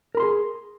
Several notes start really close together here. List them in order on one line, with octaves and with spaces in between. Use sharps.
A#4 B5 C6 G#4